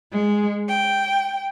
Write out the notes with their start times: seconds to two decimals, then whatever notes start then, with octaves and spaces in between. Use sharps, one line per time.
0.12 G#3
0.68 G5